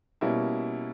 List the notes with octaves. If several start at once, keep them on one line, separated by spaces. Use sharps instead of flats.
B2 G3 A#3 C#4 E4